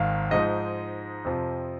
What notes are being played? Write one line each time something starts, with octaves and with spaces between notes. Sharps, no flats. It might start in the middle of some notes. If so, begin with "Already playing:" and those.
Already playing: G#1 G#2 D#3 F5
G#2 F3 G#3 D#4 D#5
F2 C3 F3